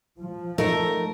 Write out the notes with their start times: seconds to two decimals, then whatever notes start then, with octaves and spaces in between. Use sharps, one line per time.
0.20 F3
0.58 A3 D#4 A#4